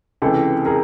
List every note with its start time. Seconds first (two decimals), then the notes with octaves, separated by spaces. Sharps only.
0.22 C#2 C3 E3 G4 A4
0.66 G#4 A#4